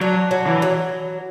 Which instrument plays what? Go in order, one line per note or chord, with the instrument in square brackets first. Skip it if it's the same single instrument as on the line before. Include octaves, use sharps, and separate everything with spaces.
[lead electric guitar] F#3 [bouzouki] D4
[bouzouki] F#3
[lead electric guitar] E3
[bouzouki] F#3